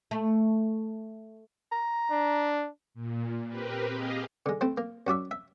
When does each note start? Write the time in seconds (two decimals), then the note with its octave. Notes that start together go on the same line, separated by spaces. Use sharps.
0.11 A3
1.72 A#5
2.11 D4
2.94 A#2
3.47 C4 G4 A#4 B4
3.91 G4 G#4 D#5 F5
4.46 D3 G#3
4.61 A3 C4 E4 C5
4.77 A#3
5.07 F#2 F#4 D5 E5
5.31 E5